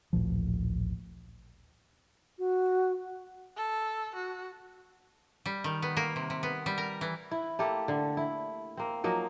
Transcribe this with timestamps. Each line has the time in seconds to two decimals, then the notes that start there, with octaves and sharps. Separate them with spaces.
0.13 A1 D2 A#2 F3
2.39 F#4
3.57 A4
4.15 F#4
5.46 G3
5.64 D#3
5.82 B3
5.97 A#3
6.16 C3
6.30 C3
6.43 B3
6.66 G3
6.78 A#4
7.01 E3
7.31 E4
7.59 A3 A#3 G4 A4
7.88 D3
8.17 E4
8.77 A#3 C4
9.04 F3 F#3 A#3 D#4